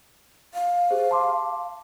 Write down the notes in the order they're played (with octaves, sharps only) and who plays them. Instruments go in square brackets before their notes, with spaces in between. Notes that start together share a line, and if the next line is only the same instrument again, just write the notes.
[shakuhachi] F5
[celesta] G4 G#4 C5
A5 C6 D6